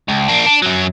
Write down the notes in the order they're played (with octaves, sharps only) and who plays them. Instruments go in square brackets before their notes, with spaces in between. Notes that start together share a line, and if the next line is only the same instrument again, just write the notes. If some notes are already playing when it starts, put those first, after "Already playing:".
[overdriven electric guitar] C#2
A#3 D4
D4
F#2 F#3